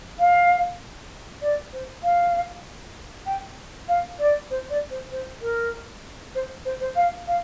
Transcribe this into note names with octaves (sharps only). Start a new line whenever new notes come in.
F5
D5
C5
F5
G5
F5
D5
C5
D5
C5
C5
A#4
C5
C5
C5
F5
F5